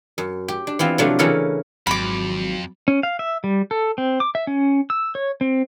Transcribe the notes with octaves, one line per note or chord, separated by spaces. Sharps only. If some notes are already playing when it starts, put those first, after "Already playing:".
F#2
G4
D4
E3 B3 C4 F4
C3 F3 F#3 A3 D4
C#3 E3 C#4 A4 A#4
G#1 F2 F#3 B5 D6
C#4
F5
E5
G3
A4
C4
D6
E5
C#4
E6
C#5
C4